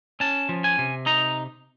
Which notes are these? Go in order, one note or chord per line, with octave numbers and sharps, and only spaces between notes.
C#4 A5
F3
G#5
C3
D#4 A#5